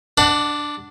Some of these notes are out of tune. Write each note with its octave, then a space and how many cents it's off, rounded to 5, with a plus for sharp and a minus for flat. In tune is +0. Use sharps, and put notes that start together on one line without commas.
D4 +0 D5 +30 F#5 +10